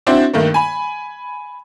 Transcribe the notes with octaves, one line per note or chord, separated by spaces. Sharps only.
C4 D4 E4 F#4 C5 D5
G2 D#3 A3 A#3
G#5 B5